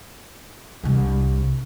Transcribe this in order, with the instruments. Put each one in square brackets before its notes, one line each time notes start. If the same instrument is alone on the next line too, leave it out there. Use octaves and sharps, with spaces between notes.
[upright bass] C2 D4